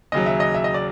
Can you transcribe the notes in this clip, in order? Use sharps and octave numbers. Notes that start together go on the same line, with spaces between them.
D#2 C#3 F#3 D#5
E5
D#5
E5
D#5
D5